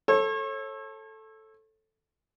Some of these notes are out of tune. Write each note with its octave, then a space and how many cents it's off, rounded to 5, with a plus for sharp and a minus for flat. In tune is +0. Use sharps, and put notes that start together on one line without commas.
A4 +0 C#5 -35